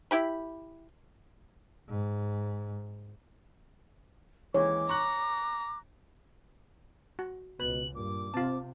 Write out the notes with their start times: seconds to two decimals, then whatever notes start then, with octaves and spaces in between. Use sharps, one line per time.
0.11 E4 G4 B5
1.89 G#2
4.54 D#2 E3 G#3 C#5 D6
4.89 A#5 C#6 F#6 F#7
7.19 F#4
7.60 C#2 B2 B4 F#7
7.95 G2 A#2 D6
8.34 C3 C4 F4 A5